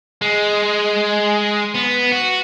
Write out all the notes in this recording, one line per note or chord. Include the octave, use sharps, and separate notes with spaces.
G#3
B3
F#4